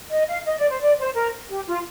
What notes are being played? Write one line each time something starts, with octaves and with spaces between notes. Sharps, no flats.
D#5
F5
D#5
D5
C5
D5
C5
A#4
G4
F4